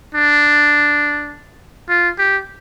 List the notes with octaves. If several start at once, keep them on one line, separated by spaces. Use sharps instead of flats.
D4
F4
G4